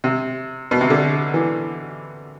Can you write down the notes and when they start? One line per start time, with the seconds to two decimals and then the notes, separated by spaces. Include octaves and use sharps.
0.04 C3
0.71 B2
0.81 C3
0.90 D3
1.34 E3